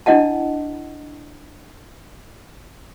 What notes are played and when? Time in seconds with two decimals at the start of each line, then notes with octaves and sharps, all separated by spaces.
0.06 D4 E4 D#5 F#5 A5